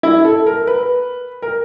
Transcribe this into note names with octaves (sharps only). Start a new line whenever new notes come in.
E4
A4
A#4
B4
A#4